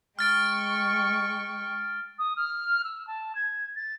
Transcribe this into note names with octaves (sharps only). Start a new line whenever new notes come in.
G#3 G5 C#6 F6 A6 D7
D#6
F6
E6
A5
G#6
A6